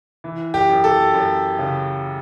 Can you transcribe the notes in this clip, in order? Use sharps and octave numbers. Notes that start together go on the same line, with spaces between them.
E3
G4
F#2
A4
F#2
C#3